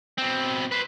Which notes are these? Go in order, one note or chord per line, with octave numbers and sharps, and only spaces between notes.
B2 C4
B4 C5